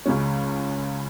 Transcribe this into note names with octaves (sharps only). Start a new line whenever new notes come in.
C#2 C#3 G#3 C#4